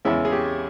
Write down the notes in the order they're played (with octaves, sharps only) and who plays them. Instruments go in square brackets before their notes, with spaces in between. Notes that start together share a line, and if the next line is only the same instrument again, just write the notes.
[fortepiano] E2 C#3 G#3 C#4 E4
G#4
G4